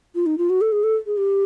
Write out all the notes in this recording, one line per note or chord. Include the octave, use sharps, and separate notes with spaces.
F4
D#4
F4
F#4
A4
G#4
A4
G#4
G4